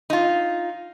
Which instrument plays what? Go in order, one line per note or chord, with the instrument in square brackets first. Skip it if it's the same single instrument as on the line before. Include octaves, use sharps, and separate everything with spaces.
[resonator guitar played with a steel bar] D#4 F4